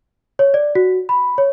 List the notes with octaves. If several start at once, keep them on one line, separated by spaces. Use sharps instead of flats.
C#5
D5
F#4
B5
C#5